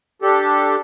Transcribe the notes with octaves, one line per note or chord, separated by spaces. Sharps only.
D4 G4 A4